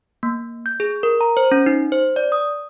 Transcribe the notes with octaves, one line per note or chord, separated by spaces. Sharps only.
A#3
G6
G#4
A#4
A#5
C5
C#4
D#4
C5
D5
D#6